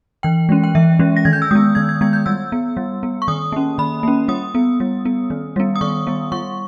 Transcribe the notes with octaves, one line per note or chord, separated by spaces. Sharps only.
E3 G5
G#3 C#4
G5
E3 E5
G#3 C#4
A#6
D#3 G#6
G6
E6
G#3 B3 D#6
D#3 G#6
G#6
G#3 B3 G#6
G6
G3 E6
B3
G3
B3
C#6
D#3 D#6
A#3 C#4
D#3 B5
A#3 C#4
G3 D#6
B3
G3
B3
D#3
G3 B3
D#6
D#3 C#6
G3 B3
G3 C#6